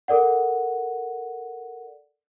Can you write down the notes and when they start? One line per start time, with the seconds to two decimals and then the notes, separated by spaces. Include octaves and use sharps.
0.08 A4 A#4 D5 F#5